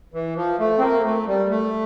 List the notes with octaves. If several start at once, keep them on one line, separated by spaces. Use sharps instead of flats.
E3
F3
A3
C4
A#3
A3
G3
A3